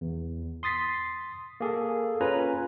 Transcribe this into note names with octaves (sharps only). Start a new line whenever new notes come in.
E2
C6 D#6 A6 B6 C7
A#3 G#4 A4
C#4 F4 B4 G#5 A#5